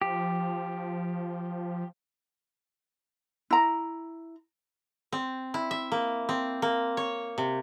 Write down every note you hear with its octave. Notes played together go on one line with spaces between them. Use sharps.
F3 G4
E4 A#5
C4
E4
E5
A#3
C4
A#3
C#5
C3